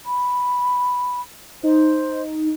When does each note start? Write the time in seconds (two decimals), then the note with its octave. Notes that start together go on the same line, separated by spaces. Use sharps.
0.06 B5
1.63 D#4 C5